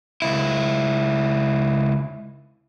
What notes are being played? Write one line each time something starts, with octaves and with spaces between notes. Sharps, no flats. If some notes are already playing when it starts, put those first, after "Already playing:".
C#2 E4